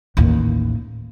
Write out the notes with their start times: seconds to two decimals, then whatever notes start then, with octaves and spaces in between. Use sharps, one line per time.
0.17 A1 D#2